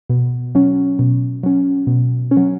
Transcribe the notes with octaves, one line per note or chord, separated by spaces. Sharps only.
B2
F#3 C#4
B2
F#3 C#4
B2
C#4
F#3